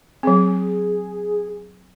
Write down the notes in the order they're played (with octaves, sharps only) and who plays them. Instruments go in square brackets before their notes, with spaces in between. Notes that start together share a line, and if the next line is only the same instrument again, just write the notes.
[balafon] F#3 C4 [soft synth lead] G#4